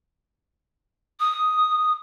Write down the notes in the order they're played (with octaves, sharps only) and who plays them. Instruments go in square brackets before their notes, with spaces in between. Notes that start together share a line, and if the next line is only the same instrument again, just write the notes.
[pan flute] D#6